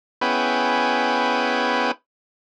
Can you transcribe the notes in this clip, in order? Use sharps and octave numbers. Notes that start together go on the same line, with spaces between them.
B3 C#4 E4 G#4 B4 G5